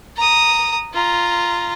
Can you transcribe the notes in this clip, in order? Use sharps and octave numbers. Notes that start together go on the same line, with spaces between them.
A#5 D#6
F4 A#5